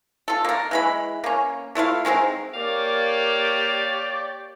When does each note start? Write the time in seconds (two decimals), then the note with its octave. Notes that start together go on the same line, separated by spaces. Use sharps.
0.28 F4 A4
0.45 A#3 A#4
0.71 E3 G#3 B5
1.24 A#3 C#4
1.75 A3 E4 F4 F5
2.05 D#3 G#3 C4 A#4
2.54 A#3 G4 C#5 D5 F5